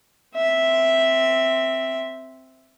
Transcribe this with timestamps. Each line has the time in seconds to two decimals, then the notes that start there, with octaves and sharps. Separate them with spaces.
0.35 C4 E5